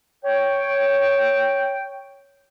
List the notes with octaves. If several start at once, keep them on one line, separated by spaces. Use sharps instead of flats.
C#5 G5